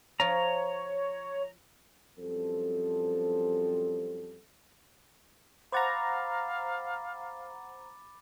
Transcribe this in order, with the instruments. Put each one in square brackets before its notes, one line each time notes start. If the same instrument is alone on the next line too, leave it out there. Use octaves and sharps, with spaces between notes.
[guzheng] F3 F4 [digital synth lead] C#5 [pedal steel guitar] A#5
[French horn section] F#2 F3 G3 C4 A4
[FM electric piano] C5 F#5 A#5 [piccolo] F5 [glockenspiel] B5 D6 A6